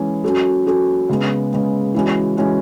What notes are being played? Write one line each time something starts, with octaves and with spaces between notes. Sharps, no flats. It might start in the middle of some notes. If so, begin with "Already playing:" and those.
Already playing: E3 G#3 C#4
F#3 C#4 F#4 A4
F#3 C#4 F#4 A4
C#3 G#3 B3
C#3 G#3 B3
E3 G#3 C#4 F#4
E3 G#3 C#4 F#4